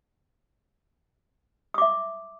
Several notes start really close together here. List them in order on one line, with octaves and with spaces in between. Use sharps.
D#6 D6 E5